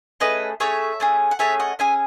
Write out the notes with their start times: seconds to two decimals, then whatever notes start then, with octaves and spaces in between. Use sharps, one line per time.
0.20 A3 C#4 G#4 B4 D#5
0.60 A3 C#4 G#4 C#5 E5
1.00 A3 C#4 G#4
1.31 F#5
1.39 A3 C#4 G#4 C#5 E5
1.60 D#5 F#5
1.79 C#4 G#4 E5 G#5